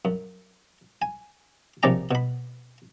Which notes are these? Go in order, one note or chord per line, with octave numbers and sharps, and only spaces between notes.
F#2
G#5
A#1 C3 C#4 D5 G5 A#5
B2 B5